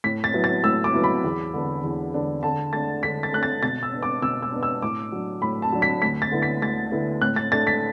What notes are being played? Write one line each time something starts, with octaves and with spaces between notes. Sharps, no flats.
A2 B6
A6
F#3 B3 E4
A6
A2 E6
D6
F#3 B3 E4
B5
E2
D3 B3 D4
E2
D3 B3 D4
D3 A5
A3 D4 A6
D3 B6
A6
A3 D4 F#6
A6
B2 A6
E6
B3 D4
D6
B2 E6
E6
B3 D4
E6
A2 D6
F#3 D4
A2 B5
A5
F#3 D4
B6
D2 B6
A6
D3 B3 E4
B6
D2 A6
D3 B3 E4
A2 F#6
A6
A3 D4 A6
B6